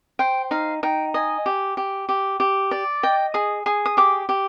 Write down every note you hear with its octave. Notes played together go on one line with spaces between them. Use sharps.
C5 G5
D#4 F5
D#4 G5
D#5 G#5
G4
G4
G4
G4
D5
D#5 G5
G#4 D#6
G#4 D#6
D#6
G4 D6
G4